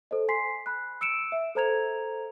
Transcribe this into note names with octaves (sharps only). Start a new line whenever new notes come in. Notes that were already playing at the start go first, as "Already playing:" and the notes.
A4 C5 D#5
G#5 C6 B6 C7
B5 F#6
E6 C#7 D7 E7
E5
A4 C5 A#5 G#6 F7